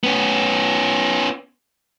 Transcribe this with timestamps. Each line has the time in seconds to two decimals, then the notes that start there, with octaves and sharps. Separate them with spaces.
0.04 B3 C#4